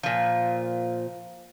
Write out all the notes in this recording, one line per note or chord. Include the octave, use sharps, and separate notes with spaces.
A#2 F3